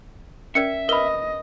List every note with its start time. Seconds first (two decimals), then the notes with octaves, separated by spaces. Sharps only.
0.55 C#4 A#4 D5 E5 C#7
0.89 A#4 B4 D#5 B5 G7